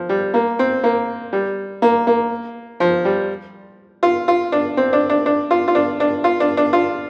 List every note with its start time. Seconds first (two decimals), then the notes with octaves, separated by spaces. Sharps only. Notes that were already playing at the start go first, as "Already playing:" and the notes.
Already playing: F3
0.09 G3
0.34 A#3
0.59 C4
0.83 A#3
1.33 G3
1.82 A#3
2.07 A#3
2.80 F3
3.05 G3
4.03 F4
4.28 F4
4.52 D4
4.77 C4
4.93 D4
5.10 D4
5.26 D4
5.51 F4
5.68 F4
5.75 D4
6.00 D4
6.24 F4
6.40 D4
6.57 D4
6.73 F4